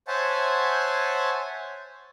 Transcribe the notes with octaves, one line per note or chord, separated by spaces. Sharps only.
C5 C#5 E5 F#5 G#5 A5